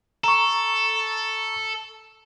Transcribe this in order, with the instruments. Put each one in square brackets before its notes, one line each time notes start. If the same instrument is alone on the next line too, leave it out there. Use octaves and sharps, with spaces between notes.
[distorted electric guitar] A4 [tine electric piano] A#5 C#6